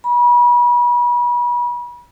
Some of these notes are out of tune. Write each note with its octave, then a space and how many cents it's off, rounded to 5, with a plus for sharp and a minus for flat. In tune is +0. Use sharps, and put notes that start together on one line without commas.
B5 -35